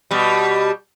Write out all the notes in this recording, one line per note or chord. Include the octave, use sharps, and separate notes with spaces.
B2 G3